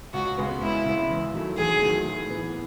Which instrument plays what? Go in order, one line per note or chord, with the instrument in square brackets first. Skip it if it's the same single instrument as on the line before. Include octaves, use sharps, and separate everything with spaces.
[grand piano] C#2 [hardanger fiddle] F#4
[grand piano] C#3 G#3 B3
[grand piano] C#2 [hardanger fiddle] E4
[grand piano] C#3 G#3 B3
E2
D#3 F#3 A3
[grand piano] E2 [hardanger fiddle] G#4
[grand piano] D#3 F#3 A3
A2
E3 B3